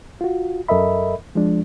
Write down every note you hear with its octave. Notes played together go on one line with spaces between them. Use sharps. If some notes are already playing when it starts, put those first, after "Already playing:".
F4 F#4
F#2 A4 A#4 D#5 E5 B5
F3 G#3 D4